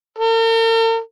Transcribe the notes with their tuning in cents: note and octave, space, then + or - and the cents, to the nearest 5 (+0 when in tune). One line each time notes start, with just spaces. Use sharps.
A#4 -45